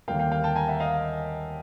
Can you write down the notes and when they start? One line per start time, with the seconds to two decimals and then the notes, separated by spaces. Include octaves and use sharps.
0.08 D#2 D3 G3 A#3 F5 G5
0.19 F5 G5
0.32 F5 G5
0.44 G5 A5
0.56 G#5 A#5
0.68 E5 F#5
0.80 D#5 F5